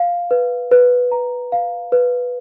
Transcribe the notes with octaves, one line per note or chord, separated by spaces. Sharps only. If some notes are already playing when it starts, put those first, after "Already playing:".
Already playing: F5
B4
B4
A#5
F5
B4